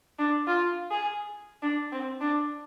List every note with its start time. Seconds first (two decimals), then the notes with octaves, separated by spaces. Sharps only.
0.19 D4
0.47 F4
0.91 G#4
1.63 D4
1.92 C4
2.21 D4